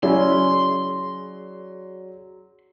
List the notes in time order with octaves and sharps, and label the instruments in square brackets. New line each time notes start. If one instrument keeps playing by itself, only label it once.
[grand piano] F#3 D5 [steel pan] C#4 E4 [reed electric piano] G#4 [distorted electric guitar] C6